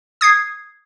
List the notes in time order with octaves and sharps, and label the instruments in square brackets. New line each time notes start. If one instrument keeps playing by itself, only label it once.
[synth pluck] D#6 G#6 C7